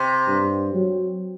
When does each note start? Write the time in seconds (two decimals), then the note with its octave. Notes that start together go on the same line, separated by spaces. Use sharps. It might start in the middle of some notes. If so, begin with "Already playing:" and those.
Already playing: C3
0.28 G2
0.74 F#3